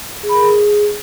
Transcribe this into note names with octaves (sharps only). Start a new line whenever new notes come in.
G#4
B5
A#4
G#4